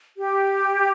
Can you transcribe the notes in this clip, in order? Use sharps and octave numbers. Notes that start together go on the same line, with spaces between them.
G4